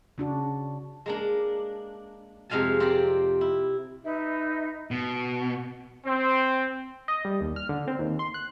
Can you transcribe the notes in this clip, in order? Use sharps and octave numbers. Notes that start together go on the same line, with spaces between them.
C#3 D4 F#4
G#3 A#3 D4
F2 C3 G#3 F5 G#5 A5
C4 F4 G4 A#4 D5
E4
D#4 B4 E5
B2
C4
D#5
G3
D#2
F6
D3
C4
D#2
C6
F#6